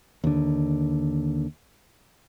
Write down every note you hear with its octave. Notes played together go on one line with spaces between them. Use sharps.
D#2 D3